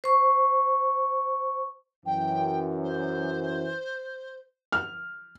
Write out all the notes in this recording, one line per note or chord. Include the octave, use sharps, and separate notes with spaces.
C5 C#6
F#2 E3 G5
C5
F6